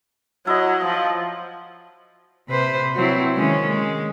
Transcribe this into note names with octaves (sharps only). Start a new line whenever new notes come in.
F#3 E4 D#5
F3
C3 B4 C5
F#3 C4 E4
D#3 G#3 C#4
G#3